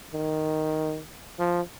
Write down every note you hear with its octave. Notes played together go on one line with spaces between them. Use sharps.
D#3
F3